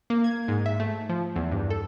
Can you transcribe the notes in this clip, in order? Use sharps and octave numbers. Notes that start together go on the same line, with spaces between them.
A#3
G#6
G#2
E5
A3
F3
E2
G2
A4